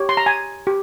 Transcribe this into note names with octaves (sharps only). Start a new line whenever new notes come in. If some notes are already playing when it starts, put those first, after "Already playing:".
Already playing: G4 C#5
C6
A#5
G#5
G4